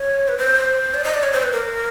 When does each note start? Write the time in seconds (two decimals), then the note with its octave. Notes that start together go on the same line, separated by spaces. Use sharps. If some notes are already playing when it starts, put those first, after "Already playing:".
Already playing: C#5
0.28 B4
0.38 C5
0.94 D5
1.04 D#5
1.14 D5
1.23 C#5
1.33 C5
1.43 B4
1.52 A#4